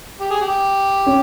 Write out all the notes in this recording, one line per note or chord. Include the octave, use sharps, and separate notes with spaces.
G4
G#4
G4
C#4